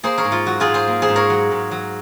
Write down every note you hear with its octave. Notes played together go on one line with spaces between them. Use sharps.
A#3 G#4 C5
A#4 C#5
G#2
F4
F#3 F#4
F4 G#4
G#2
G#4 C5
A#3
G#4 C5
G#2
A#4 C#5
F#3
G#2
F#3